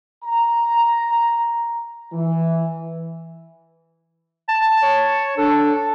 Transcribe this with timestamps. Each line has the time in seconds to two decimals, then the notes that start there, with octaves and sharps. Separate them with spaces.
0.24 A#5
2.13 E3
4.49 A5
4.83 C#5
5.37 D4 A4